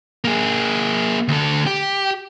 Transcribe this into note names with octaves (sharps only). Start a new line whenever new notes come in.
A#3 G#4
D2 A4
G4